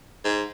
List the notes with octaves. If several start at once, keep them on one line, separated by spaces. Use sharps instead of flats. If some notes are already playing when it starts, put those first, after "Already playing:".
G#2